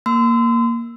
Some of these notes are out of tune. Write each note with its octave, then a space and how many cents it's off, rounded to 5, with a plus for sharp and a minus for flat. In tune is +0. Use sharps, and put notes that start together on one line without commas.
A#3 +0 C6 -35 E6 +0